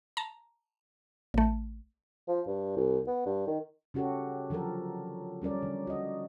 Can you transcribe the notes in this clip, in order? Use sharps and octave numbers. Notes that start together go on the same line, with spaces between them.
A5 A#5
A1 A3
F3
G2
C2
B3
G2
D#3
C#3 C#4 F#4 G4 A4
D3 F3 F#3 A4 A#4
G3 C#4 A#4 D5
D3
F#4 D#5